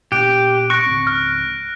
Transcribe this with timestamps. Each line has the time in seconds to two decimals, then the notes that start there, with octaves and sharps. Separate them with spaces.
0.12 A#2 B3 D4 G4 F#6 D7
0.70 C#6 F#6 A#6 D7
0.86 C#2 G#2 C4
1.07 F6